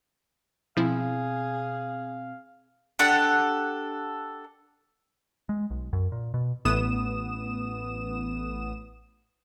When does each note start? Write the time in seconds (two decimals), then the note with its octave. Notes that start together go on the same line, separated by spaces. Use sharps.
0.77 B2 F3 C4 E4 G#4 F5
2.99 D4 G4 A4 F#5
5.49 G#3
5.70 B1
5.93 F#2
6.12 A#2
6.34 B2
6.65 A1 A2 B3 D#6 E7